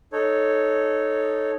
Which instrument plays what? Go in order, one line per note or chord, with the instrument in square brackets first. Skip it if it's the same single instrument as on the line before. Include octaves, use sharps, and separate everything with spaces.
[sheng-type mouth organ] D#4 A4 C#5